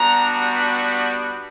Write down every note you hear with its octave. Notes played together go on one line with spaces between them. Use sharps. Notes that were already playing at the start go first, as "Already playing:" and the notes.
Already playing: G3 B3 D4 F#4 A#5
B5